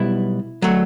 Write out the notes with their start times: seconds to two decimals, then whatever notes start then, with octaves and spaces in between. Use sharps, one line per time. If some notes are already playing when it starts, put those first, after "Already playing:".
Already playing: B1 B2 G3 B3 E4
0.62 F#3 A3